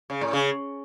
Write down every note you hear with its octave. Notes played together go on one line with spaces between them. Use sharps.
C#3
A2
C#3